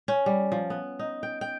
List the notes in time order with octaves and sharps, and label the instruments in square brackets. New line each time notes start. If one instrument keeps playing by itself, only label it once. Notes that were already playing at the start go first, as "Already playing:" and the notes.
[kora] C#4
G3
F3
B3
D#4
G5
G5